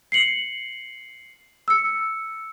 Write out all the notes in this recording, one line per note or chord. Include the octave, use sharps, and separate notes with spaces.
C7 C#7 F#7
E6 C#7